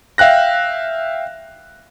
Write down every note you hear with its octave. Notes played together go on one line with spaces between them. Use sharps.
E5 F5 G5 F#6 A#6